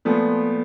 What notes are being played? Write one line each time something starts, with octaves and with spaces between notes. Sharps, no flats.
A#2 F3 A3 B3